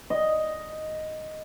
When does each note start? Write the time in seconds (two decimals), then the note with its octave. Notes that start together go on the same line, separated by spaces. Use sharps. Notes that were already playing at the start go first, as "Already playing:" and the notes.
0.10 D#5